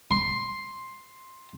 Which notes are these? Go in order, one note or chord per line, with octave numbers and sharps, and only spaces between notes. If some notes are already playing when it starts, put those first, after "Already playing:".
C6